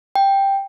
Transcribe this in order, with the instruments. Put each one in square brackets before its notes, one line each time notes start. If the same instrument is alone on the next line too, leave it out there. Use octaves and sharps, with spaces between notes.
[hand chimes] G5